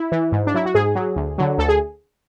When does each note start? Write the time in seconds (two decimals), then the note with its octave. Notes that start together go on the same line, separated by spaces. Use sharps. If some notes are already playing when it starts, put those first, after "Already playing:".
Already playing: E4
0.12 E3
0.32 G#2
0.47 D4
0.54 F#3 E4
0.66 F#4
0.75 G#2 G#4
0.95 F#3
1.16 D2
1.38 D3 F#3
1.58 D2 A4
1.69 G#4